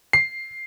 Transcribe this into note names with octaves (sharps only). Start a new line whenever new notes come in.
C7